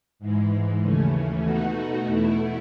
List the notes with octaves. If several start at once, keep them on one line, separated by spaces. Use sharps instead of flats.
G#2 E3 G#3
D#2 C#3 E3 A3 C#4
B2 A3 D#4 F#4
E2 B2 A3 E4